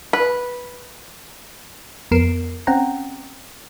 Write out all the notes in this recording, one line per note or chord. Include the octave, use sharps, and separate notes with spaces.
B4
F2 B3 A#4 C7 D7 E7
C4 C#4 F#5 G5 A#5